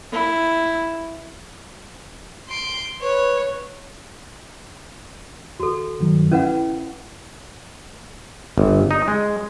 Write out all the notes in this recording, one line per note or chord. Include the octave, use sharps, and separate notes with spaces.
E4
C6 D7
B4 C#5
D#2 F#4 A4
G2 D#3 F#3
C#4 E4 B4 F#5
G1
D#4
G#3